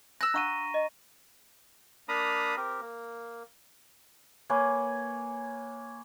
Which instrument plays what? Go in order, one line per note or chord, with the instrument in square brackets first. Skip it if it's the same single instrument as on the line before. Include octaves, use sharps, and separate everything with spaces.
[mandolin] E6 F#6 [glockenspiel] A#6
[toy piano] D4 F5 F#5 [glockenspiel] A#5 C#6 D#7
[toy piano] D#5
[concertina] A#3 D4 F5 A#5 B5 D#6
C4 G4 A#4
A#3
[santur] A#3 B4 C#5 G#5